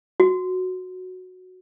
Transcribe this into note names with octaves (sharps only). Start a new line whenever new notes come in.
F#4